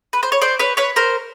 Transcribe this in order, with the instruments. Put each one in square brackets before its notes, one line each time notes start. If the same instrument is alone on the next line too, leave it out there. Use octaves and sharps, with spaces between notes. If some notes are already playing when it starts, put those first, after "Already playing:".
[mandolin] B4
C5
C#5
C5 D5
B4 C#5
B4 C#5
A#4 C5